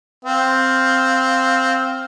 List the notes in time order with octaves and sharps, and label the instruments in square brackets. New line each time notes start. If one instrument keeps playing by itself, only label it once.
[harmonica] C4 F5